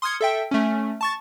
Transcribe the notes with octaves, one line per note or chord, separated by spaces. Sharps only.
C6 D#6 F6 G#6 C#7
A4 E5 G5
A3 C#4
A5 C#6 A6